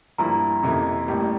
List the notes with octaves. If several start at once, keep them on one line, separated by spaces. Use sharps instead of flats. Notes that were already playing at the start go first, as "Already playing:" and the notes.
G2 F3 A#3 E4 A#5
F2 C3 E3 A#3
A1 A2 G3 A#3